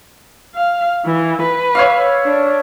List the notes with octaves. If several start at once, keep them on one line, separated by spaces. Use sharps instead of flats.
F5
E3
B4
C#5 E5 F5
D4